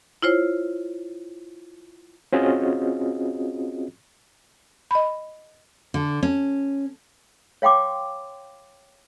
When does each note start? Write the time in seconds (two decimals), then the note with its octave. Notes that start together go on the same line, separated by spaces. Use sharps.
0.22 E4 F4 C5 C#5
2.33 C4 C#4 F4 F#4 G#4 D#5
4.91 D#5 B5
5.94 D3
6.23 C#4
7.62 C#5 F5 G5 C6 D6